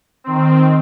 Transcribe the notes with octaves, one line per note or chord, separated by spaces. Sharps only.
D#3 C4